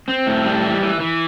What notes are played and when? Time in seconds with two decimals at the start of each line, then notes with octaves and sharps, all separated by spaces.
0.08 C4
0.27 A2
0.44 G3
0.63 E3
0.81 E3
1.00 E3